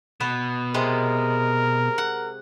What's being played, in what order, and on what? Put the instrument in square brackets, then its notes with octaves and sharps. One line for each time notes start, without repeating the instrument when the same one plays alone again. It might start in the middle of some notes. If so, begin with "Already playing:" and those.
[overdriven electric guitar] B2 [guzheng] B3
[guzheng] C3 G#3 [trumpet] A#4
[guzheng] F#5